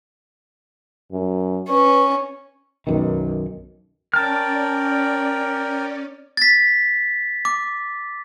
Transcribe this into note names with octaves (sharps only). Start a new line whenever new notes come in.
F#2
C#4 B4
B1 F#2 D#3
C#4 A#4 D5 G5 A5 F6
A6 B6
D6